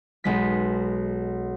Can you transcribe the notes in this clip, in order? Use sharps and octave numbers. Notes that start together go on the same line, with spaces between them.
B1 G#3 B6